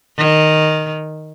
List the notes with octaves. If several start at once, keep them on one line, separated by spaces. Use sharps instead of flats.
D#3